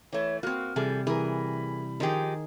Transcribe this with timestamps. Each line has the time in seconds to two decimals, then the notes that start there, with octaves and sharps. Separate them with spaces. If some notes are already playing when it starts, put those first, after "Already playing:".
0.13 E3 A3 C#5
0.43 A#3 C4 F#4 F6
0.76 C3 E3 G3 G#4 A4
1.07 E3 G#4 A#4 B5
2.00 D#3 F3 D#4 G4 G#4